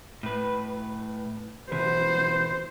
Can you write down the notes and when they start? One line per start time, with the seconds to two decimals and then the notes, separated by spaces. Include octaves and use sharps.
0.23 A2 B4
1.72 B2 E3 C5